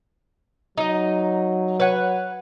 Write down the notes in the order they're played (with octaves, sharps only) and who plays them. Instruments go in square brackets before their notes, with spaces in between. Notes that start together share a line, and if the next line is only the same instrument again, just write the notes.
[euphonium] F#3 [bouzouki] D#4 D#5
[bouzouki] B4 C#5 F#5